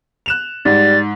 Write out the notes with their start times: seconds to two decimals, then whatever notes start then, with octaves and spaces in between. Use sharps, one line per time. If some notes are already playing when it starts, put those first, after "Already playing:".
0.26 F#6 E7 F7
0.65 G#2 G3 A6